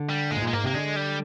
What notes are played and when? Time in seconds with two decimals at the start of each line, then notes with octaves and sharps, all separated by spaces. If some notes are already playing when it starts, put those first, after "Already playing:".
Already playing: D3
0.09 G3
0.31 A#2 G#3
0.36 G#2
0.42 A#2
0.47 G#3
0.53 G#2 A#3
0.64 C3 A#3
0.74 D3 G#3
0.96 G3